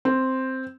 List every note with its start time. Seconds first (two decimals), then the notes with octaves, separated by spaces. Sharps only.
0.05 C4